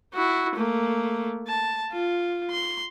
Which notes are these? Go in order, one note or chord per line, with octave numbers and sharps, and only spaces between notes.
E4 F#4
A3 A#3
A5
F4
C6